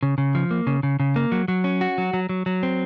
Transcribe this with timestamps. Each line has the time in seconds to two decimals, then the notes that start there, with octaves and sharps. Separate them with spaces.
0.03 C#3
0.18 C#3
0.35 F3
0.51 A#3
0.67 C#3
0.83 C#3
1.00 C#3
1.16 A#3
1.32 F#3
1.48 F#3
1.64 C#4
1.81 F#4
1.98 F#3
2.14 F#3
2.29 F#3
2.46 F#3
2.63 C4